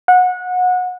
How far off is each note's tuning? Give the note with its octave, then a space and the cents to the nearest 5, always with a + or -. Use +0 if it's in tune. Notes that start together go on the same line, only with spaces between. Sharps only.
F#5 -25